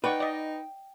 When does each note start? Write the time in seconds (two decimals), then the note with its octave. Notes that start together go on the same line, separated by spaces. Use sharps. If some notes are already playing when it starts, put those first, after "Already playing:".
0.04 D#4 B4 D5 F#5 G5 C#6
0.20 D5 D#5